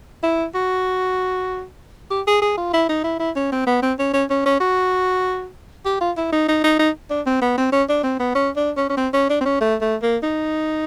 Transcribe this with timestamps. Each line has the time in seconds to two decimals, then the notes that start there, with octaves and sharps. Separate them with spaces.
0.23 E4
0.55 F#4
2.10 G4
2.27 G#4
2.42 G#4
2.58 F4
2.74 E4
2.89 D#4
3.04 E4
3.20 E4
3.36 C#4
3.52 C4
3.67 B3
3.82 C4
3.99 C#4
4.13 C#4
4.30 C#4
4.46 C#4
4.60 F#4
5.85 G4
6.01 F4
6.17 E4
6.32 D#4
6.49 D#4
6.64 D#4
6.79 D#4
7.10 D4
7.27 C4
7.42 B3
7.58 C4
7.72 C#4
7.89 D4
8.04 C4
8.20 B3
8.35 C#4
8.56 D4
8.77 C#4
8.90 C#4
8.97 C4
9.14 C#4
9.30 D4
9.41 C4
9.45 C#4
9.61 A3
9.81 A3
10.03 A#3
10.23 D#4